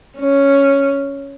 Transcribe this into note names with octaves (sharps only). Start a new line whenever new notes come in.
C#4